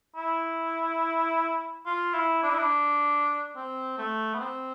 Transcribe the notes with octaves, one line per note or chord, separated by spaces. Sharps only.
E4
F4
E4
D4
E4
D4
C4
A3
B3
C4